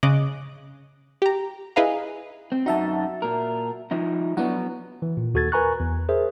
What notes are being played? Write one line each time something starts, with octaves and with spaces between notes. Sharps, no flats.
C#3 C#5 D#5 D6 F#6
G4 A#5
E4 G#4 B4 D#5 F5 A#5
C4
F#2 D#4 F#4 E5 A5
A#2 A#4
F3 D#4 E4
F#3 B3 D4 E4 F#5
E3
A#2
D#2 F#4 A4 G#6 A6
A#4 B4 G#5 A#5 C#6 F#6
E2
G#4 A#4 C5 E5